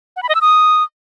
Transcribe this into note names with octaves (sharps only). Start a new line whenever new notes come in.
F#5
B5
D#5
E6
D#6